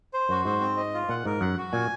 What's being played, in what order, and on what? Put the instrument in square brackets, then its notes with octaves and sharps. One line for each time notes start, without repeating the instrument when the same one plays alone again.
[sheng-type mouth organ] C5
[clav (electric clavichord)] F#2 [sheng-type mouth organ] F#4
[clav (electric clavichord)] G#2 [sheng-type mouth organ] C5
[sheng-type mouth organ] C4
D#5
F4
[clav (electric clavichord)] A#2 [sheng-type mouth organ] F#5
[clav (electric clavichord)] G#2 [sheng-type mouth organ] A#4
[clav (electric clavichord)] F#2 [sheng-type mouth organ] F#5
[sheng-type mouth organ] F#4
[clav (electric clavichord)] A#2 [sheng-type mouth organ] G#5